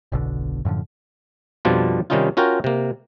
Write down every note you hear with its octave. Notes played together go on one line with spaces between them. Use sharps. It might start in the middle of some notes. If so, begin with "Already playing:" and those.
F#1 B1 B2 D3
F#2 A2 D3 F3
F2 B2 F3 G3 D4 F4
C3 D#3 G3 C#4 D#4 F4
C#4 F4 F#4 A#4 G5
C3 A#3